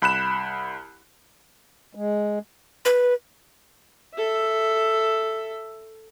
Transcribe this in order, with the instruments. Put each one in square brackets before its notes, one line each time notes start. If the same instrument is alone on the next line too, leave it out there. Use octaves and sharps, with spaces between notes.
[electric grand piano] C2 B5 F#6 E7
[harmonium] G#3
[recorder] B4
[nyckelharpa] A4 E5